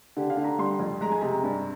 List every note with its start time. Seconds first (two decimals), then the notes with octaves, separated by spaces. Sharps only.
0.17 D3 G4
0.30 F5
0.37 D3
0.44 A#5
0.58 G3 C6
0.79 F2
1.01 G#3 A#5
1.12 G#5
1.21 C3 A#5
1.44 G2